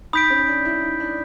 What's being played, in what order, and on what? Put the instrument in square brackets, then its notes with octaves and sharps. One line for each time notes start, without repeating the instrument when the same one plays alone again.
[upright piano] D#4 [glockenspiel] B5 D#6 G6 B6 D7
[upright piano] C#4
D4
E4
D#4
D4